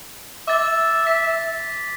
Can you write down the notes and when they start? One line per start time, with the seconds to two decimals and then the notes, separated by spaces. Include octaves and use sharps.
0.48 E5 D6 A6
1.07 B6